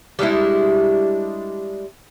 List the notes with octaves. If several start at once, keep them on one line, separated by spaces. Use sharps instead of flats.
G3 G#3 D4 E4